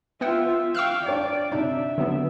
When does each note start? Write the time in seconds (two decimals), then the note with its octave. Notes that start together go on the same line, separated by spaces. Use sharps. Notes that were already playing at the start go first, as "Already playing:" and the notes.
0.21 B3 F4 E5 F#5 G5
0.75 F5 G5 C#6 E6 F#6
1.06 D4 C#5 D5 G5
1.52 C3 D4 D#4 E5
1.98 D3 F#3 B3